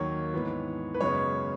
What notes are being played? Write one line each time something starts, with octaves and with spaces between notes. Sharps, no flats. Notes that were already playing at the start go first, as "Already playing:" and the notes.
Already playing: D#2 D#3 F#3 A#3 C#5
G#2 E3 B3
B4
F#2 C#3 G#3 B3 C#5